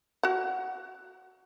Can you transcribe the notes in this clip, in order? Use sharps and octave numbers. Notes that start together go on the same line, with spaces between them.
F#4 F#5